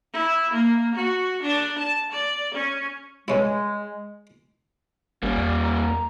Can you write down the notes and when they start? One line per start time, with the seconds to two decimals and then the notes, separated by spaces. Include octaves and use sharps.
0.13 E4
0.53 A#3
0.96 F#4
1.43 D4
1.79 A5
2.12 D5
2.54 C#4
3.28 G2 G#3 C#4 E4
5.23 G#1 G3 A#3 C#4
5.36 E2 D5
5.63 A#5